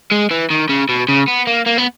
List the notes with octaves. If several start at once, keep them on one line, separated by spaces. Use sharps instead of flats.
G#3
E3
D#3
C#3
B2
C#3
B3
A#3
A#3
B3